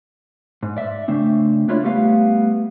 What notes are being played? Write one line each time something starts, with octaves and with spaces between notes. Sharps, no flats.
G#2
D5 E5
C#3 A3 C4 D4
A#3 D4 E4 F4 C#5 D5
G3 A3 B3 G4 F5